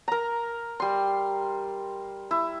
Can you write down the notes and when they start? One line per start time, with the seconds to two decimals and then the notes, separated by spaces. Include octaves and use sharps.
0.08 A#4 A#5
0.80 G3 C6
2.31 E4